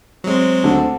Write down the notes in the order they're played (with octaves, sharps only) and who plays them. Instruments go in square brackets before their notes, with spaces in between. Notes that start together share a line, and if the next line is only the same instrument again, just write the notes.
[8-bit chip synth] F#3 G#3 [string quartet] C4
[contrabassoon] D2 [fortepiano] D3